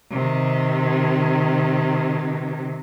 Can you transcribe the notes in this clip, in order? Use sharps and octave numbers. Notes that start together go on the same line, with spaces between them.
C3 D#3